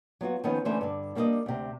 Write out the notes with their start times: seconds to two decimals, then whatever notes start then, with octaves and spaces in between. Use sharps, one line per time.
0.21 F#3 B3 F4 F#4
0.44 D#3 F3 B3 C#4 D#4
0.65 D3 E3 A3 C#4 D4 C5
0.81 G2 D3
1.15 G3 A#3 D4 F#4 D5 D#5
1.46 D2 C3